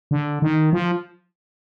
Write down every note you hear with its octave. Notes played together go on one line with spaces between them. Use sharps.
D3
D#3
F3